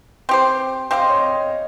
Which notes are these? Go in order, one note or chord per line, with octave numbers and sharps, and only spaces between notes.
C4 G4 C5
C4 G4 C5 F5
D#5
C#5
D#5